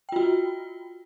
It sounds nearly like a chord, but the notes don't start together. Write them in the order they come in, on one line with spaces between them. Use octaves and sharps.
G5 F4 F#4